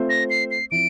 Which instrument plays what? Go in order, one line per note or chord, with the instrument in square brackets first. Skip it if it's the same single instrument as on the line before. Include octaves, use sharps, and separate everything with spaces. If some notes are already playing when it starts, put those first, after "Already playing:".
Already playing: [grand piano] A3 C4 F4 C5 E5
[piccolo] A#6
C7
C7
[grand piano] F3 C4 E4 [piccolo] D7